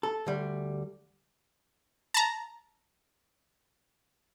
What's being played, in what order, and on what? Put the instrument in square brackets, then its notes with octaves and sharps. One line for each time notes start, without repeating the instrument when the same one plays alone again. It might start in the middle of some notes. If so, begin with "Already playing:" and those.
[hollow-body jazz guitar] A4
D2 G3
[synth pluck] A5 A#5